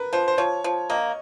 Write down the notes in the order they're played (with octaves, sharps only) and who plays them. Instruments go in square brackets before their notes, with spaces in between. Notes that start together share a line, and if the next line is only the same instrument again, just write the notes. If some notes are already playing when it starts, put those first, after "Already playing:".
Already playing: [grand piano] A#4 B4
[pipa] F3 [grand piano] C5
[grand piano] C5
[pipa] F3 [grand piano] C#5
[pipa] F3
[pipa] A#3 [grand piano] D#5